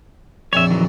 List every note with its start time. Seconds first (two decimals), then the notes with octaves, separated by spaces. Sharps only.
0.53 A#1 F2 A#2 C#5 E5
0.71 D#3 E3 F#3